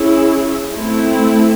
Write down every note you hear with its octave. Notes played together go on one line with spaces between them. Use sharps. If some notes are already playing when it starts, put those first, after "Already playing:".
Already playing: C#4 E4 G#4
A3 C4 E4